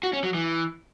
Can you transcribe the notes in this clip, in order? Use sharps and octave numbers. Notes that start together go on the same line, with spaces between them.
F#4
C#4
F#3
E3